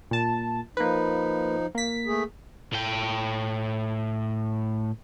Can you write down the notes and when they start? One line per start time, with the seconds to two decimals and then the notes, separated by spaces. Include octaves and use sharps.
0.11 A#2 A5
0.77 F3 A#3 D#4 B4
1.75 A#3 B6
2.07 A3 G#4
2.73 A2 G5